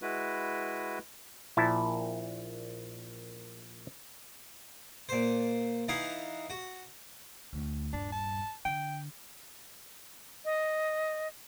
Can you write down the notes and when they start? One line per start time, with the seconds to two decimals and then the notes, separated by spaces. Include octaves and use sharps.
0.02 G#3 E4 F#4 B4
1.57 A#1 A#2 E4 A5
5.09 A#2 C5
5.88 E3 D#4 E4 F5 F#5
6.50 F#4
7.53 D2
7.93 D#1 G2 D4
8.12 A5
8.65 D3 G5
10.45 D#5